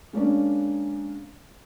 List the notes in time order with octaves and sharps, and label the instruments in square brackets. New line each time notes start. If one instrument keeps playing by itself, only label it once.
[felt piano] G#3 A#3 C#4 D4